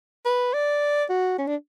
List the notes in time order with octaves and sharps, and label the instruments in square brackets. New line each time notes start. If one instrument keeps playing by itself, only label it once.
[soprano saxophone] B4
D5
F#4
C#4
D4